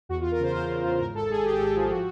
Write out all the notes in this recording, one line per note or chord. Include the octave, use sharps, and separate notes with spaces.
E2 F#4
F4
E2
A#4
C#3 C5
E2 C5
C#3
E2
G#1 A#4
G#1 A4
G#2 G#4
G#2 G4
G#2
F3
F#4